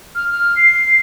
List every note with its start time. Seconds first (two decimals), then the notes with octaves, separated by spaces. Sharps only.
0.15 F6
0.30 F6
0.56 C7